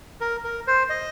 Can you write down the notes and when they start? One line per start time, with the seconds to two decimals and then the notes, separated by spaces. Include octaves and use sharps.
0.21 A#4
0.44 A#4
0.67 C5
0.89 D#5